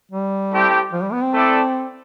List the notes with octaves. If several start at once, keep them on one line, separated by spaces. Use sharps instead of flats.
G3
A3 C4 E4 G4
F3
G3
B3
C4
A3 E4 A4 D5